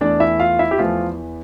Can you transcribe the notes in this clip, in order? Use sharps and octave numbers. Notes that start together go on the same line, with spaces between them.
E2 E3 A3 D4 D5
E4 E5
F4 F5
E4 E5
G4
E2 E3 F3 A3 F4